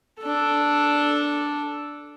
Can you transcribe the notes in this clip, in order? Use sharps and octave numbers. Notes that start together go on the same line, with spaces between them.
D4 A4